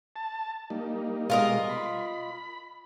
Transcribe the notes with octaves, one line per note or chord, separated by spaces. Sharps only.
A5
G3 A#3 D#4
B2 G3 G#3 F4 A#4 D#5
B5